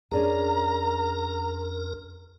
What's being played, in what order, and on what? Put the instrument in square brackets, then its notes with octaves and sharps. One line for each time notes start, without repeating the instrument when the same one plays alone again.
[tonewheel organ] F2 A#4 [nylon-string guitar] C#4 D4 G#4 [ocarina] A#5